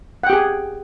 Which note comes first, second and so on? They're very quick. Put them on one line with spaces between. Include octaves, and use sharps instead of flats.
F#5 G5 G4 G#4